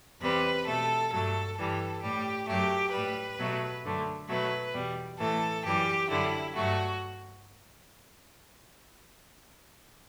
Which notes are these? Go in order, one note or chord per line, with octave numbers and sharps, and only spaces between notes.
E2 C3 G3 B4
B2 A3 A4
G2 F#3 A3 A4
G2 E3 G3 A4
A2 G3 G4
F#2 F#3 A3 G4
A2 G3 B4
B2 F#3 A3
F#2 D3 A3
B2 F#3 A3 B4
E2 B2 G3
A2 E3 A3 A4
F#2 E3 G3 G4
F#2 D3 G3 E4
G2 F#3 A3 F#4